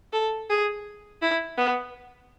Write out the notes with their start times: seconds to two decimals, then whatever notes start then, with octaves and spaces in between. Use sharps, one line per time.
0.13 A4
0.50 G#4
1.22 E4
1.57 B3